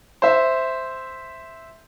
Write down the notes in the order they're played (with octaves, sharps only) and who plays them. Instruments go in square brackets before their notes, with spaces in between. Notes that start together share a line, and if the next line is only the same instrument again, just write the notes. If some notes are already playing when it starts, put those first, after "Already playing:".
[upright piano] C5 E5